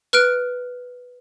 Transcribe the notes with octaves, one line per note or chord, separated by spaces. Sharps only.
B4 F6 F#6 D7